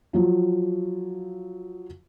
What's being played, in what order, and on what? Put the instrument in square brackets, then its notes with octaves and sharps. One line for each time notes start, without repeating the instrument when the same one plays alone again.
[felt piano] F3 F#3 F4